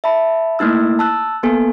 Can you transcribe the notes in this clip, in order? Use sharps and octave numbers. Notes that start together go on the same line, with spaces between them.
E5 A5 B5
A3 A#3 D#4 E4 E6
A5 E6 F#6
A#3 B3 A4 G#5